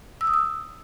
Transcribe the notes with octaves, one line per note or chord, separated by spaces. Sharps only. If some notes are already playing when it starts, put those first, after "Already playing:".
E6
D#6
E6